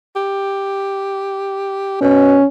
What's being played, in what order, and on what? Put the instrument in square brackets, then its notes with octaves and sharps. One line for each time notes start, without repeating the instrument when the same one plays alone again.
[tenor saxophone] G4
[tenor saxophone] B2 [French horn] C#4